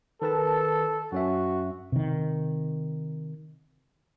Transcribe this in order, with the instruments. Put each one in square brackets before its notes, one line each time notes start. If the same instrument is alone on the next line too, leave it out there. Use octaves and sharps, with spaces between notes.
[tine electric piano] D#3 B4 A5 [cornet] A4
[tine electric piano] F#2 C#4 E5 [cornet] F#4
[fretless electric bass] C3 D#3